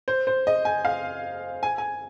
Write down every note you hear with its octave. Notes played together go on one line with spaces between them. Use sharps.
C5
C5
D#5
G#5
F5
G#5
G#5